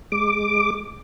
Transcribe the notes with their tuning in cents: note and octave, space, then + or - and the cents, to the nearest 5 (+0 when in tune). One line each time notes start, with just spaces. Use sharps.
G#3 +0 D6 +5